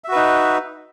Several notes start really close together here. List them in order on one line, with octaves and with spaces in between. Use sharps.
E5 F#4 B4 D#4